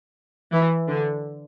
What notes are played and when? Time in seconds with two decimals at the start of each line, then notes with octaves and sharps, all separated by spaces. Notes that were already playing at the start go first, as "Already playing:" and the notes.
0.53 E3
0.88 D3